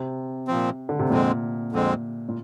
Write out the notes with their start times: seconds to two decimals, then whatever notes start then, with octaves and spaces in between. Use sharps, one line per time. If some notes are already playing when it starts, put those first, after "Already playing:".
Already playing: C3
0.48 A#2 F3 C4
0.89 D3
0.99 C3
1.09 F2 A#2 D3 G#3 C4
1.72 F2 D3 G#3 C4
2.29 A#2